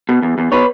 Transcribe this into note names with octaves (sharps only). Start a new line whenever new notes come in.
B2
E2
E2
B2 B4 C#5